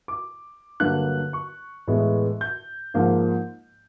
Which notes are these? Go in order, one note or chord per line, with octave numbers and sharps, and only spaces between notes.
D6
G2 D3 F#3 A#3 F#6
C#6
A2 E3 G#3 B3
G6
G#2 F3 A#3